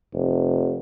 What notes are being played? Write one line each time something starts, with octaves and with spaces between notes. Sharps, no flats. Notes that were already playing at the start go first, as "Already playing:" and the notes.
F1